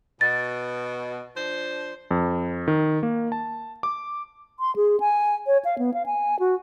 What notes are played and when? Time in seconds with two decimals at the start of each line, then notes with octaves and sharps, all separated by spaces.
0.21 B2 A6
1.36 F3 D4 C5
2.11 F2
2.68 D#3
3.03 A#3
3.32 A5
3.83 D6
4.60 C6
4.76 G#4
5.00 G#5
5.47 C#5
5.65 F5
5.78 B3
5.94 F5
6.06 G#5
6.40 F#4